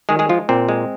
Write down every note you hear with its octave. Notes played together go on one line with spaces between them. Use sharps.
D#3 G#3 G#4
G#3 G#4
F3 G#3 F4
A#2 C4
G#3